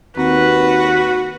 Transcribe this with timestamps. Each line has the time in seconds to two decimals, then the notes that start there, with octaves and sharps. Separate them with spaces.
0.17 D#2 C4 F#4 B4